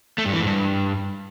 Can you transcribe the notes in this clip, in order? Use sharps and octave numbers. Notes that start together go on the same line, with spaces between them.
A3
G2
E3
G#2
G2